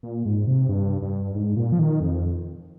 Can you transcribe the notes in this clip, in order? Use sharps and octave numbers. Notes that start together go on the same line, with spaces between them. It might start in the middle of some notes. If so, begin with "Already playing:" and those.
A#2
G#2
C3
G2
G2
G#2
A#2
F3
D#3
F2